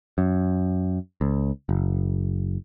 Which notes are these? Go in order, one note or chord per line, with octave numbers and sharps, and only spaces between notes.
F#2
C#2
F#1